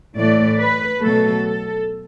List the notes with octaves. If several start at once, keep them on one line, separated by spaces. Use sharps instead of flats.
A2 E3 A3 D5
B4
B2 F#3 A3 A4
A4